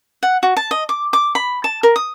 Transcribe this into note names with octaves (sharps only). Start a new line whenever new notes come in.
F#5
F#4
A5
D#5
D6
D6
B5
A5
A#4
D#6